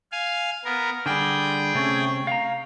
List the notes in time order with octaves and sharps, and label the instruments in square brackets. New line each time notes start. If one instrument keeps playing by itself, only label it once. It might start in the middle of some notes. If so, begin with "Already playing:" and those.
[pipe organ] F5 G#5
B3 A#4
[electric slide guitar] D3 G3 [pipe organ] G#4 G5
[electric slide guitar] C3 A3 C#4
F5 A#5